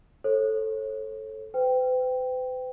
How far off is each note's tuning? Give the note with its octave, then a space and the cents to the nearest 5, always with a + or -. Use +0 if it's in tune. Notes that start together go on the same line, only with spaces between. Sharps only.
A4 +0 C#5 -40
B4 +45 G5 +0